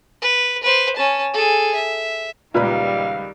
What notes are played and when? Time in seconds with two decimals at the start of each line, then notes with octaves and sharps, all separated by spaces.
0.22 B4
0.63 B4 C5
0.96 C#4 A5
1.34 G#4 A4
1.75 E5
2.54 C#2 A#2 D#3 G3 B4 F5 B5